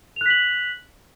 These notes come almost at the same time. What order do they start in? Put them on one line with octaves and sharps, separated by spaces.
F7 F#6 B6 F#7